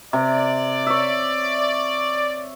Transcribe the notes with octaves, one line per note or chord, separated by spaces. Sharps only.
C3 D5
C#5 E5